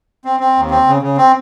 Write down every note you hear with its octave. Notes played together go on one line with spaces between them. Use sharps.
C4
C4
D#2
C4
C#3
C#3
C4